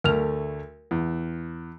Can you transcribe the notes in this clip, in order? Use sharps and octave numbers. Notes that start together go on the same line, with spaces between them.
D2 A3 A#4 F6 F7
E2